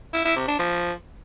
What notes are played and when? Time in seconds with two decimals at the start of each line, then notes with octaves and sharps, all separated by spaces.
0.13 E4
0.25 E4
0.36 C3
0.47 D4
0.59 F3